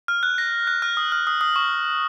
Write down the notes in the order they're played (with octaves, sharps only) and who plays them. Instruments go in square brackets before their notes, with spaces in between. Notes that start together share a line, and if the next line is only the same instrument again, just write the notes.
[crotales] F6
F#6
A#6
F#6
F6
D#6
F6
D#6
D#6
C#6